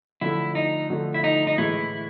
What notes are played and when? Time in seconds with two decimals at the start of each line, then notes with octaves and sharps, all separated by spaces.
0.21 D3 F3 A3 E4
0.55 D#4
0.90 D3 F3 A3
1.14 E4
1.24 D#4
1.47 D#4
1.58 A2 E3 G#3 E4